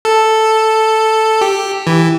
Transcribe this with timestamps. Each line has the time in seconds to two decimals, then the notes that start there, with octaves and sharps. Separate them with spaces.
0.05 A4
1.41 G4
1.87 E3